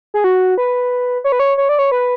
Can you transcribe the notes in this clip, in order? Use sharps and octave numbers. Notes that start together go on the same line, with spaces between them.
G#4
F#4
B4
C#5
B4
C#5
C#5
D5
C#5
B4